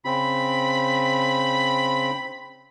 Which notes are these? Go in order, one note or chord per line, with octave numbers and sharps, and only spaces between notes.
C#3 C4 B5